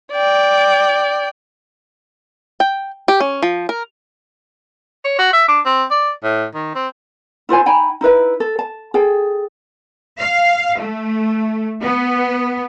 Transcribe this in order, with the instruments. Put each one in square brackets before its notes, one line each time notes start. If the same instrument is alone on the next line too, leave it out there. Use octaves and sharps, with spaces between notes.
[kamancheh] D5 G5
[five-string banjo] G5
G4
C#4
F3
A#4
[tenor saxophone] C#5
F#4
E5
D4
C4
D5
A2
D#3
C4
[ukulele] E4 F4 C5 G#5
D#4 G5 G#5 B5
D#4 E4 B4 E5
A4
A5
G#4 A4 G5
[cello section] F5
A3
B3